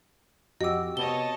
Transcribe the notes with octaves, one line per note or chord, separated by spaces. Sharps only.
F2 F#4 G4 D#5 D6 E6
C3 B3 C#5 D#5 A5 G7